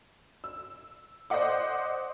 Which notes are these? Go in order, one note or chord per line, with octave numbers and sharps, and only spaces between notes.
E6
C5 D5 D#5 F#5 D6